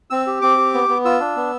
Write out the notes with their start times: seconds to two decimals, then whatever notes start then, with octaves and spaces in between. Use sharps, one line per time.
0.10 C4 E6
0.27 G4
0.42 C4 D6
0.57 G4
0.74 B3
0.89 B3
1.05 F4 E6
1.20 D4
1.36 B3